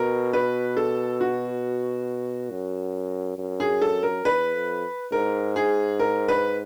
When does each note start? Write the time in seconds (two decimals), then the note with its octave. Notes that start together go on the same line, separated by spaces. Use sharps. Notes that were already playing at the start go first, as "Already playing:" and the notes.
Already playing: B2 A#4
0.33 B4
0.77 A4
1.21 F#4
2.51 F#2
3.38 F#2
3.60 G#4
3.82 A4
4.03 A#4
4.25 E2 B4
4.54 F2
5.12 G#2 A#4
5.56 G#4
5.99 A#4
6.28 B4